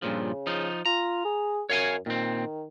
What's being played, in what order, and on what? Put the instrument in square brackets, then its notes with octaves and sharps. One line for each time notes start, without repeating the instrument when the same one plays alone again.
[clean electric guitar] G2 A#2 F3 [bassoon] C#3
[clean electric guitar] F3 D#4
[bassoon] F4 [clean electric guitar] A#5
[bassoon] G#4
[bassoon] F#2 [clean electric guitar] C#5 F5 G#5
[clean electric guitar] A#2 C4 [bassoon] D#3